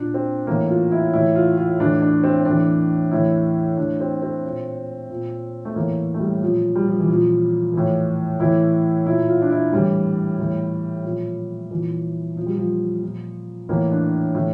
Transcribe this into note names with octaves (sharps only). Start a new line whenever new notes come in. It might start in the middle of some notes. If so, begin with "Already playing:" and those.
Already playing: A#2 D4
C4
A2 E3 A#3
F4
E4
A2 E3 E4
F4
F4
A2 E3 D4
D4
C4
A2 E3 D4
A2 E3 E4
A2 E3 D4
C4
C4
A#2
A#2
A3
A2 E3 A#3
A3
G3
A#2 F3
G3
F3
E3
A#2 F3
A2 E3
A2 E3 E4
A#2 E4
F4
D4
E4
A2 E3 G3
A2 E3
A#2 F3
A#2 E3
A#2 F3
G3
F3
A#2
A2 E3 A#3
D4
A2 E3